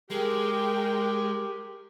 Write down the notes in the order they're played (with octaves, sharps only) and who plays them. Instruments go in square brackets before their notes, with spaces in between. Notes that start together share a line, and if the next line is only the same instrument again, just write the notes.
[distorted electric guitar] G#3 [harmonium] G4 [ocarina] G#4 [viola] A#4 G5